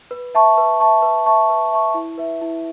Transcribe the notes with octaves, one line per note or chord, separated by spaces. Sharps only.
B4
E5 A5 C#6
B4
E5 A5 C#6
B4
E5 A5 C#6
B4
E5 A5 C#6
E4
B4 E5
E4